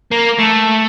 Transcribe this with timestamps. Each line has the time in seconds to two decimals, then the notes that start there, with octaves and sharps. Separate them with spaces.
0.11 A#3
0.38 A3